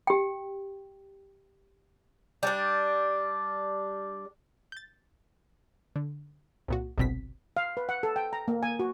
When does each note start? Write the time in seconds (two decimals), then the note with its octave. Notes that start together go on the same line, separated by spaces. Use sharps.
0.07 G4 G5
2.43 G3 D4
4.72 G6 A6
5.96 D3
6.68 C2 A#2 F#4
6.98 G1 C2 B2 C4 B6
7.57 F5
7.77 B4
7.89 F#5
8.03 A4
8.16 G5
8.33 A#5
8.48 A#3
8.63 G#5
8.79 F#4